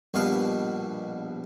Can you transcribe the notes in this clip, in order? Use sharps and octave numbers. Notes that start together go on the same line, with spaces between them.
A#1 G2 B2 F5